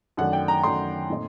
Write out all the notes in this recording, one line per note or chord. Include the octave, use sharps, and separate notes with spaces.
F#2 D#3 A3 D4 F#5
G5
A#5
F#2 D#3 A3 D4 C6
A#2 A3 C4 D#4